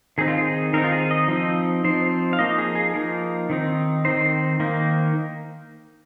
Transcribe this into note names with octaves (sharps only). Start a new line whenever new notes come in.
D#3 C4 D#4 G#4
F4
G#4
D#3 C4 D#4 A#4
F4
G#4
D#5
F3 C4 D#4
F3 C4 D#4 C5
F5
F3 A#3 D#4 D#5
G#4
G#4
F3 A#3 D#4 A#4
D#3 C4 D#4
D#3 C4 D#4 C5
D#3 A#3 D#4